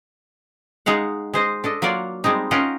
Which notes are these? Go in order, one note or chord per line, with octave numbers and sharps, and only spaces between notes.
G#3 D#4 F5 F#5
G#3 C5 D#5
D4 A4 D#5
F#3 A#3 F4 D5 F#5
G3 G#3 C4 D#4
C#4 F4 A#4 D#5 F#5 G5